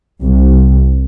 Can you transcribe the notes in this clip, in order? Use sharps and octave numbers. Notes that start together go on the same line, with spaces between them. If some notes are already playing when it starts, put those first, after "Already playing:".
C2